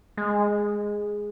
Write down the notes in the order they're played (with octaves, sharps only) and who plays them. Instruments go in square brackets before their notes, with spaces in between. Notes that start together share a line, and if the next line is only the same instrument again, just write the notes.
[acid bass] G#3